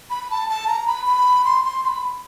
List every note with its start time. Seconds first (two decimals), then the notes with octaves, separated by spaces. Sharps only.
0.10 B5
0.31 A5
0.50 A5
0.68 A#5
0.87 B5
1.06 B5
1.45 C6
1.64 C6
1.83 C6
1.88 B5